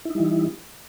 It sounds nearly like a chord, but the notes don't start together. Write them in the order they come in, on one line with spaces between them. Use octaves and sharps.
E4 D#4 G3 E3